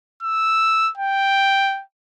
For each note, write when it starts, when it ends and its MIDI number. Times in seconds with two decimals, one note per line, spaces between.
0.23 0.91 88
0.97 1.83 79